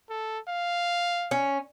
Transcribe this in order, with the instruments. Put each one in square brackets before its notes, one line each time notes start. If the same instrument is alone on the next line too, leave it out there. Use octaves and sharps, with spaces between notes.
[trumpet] A4
F5
[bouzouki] C#4